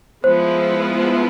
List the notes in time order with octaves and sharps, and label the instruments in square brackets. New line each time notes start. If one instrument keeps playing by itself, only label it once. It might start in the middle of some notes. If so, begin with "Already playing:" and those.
[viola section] F3 G#3 B3 E4 [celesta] C5